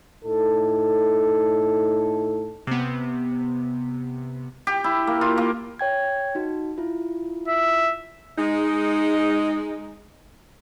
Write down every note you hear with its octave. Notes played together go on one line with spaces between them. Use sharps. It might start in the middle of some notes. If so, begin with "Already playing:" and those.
A2 D#4 A4
C3 B3
G4
E4
A#3
F4
A#3
C#5 G5 G#6
D#4 F#4
E4 F4
E5
G#3 D#4